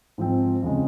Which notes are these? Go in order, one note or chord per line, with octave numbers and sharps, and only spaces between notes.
G#2 F3 C4
F2 C#3 G#3 D#4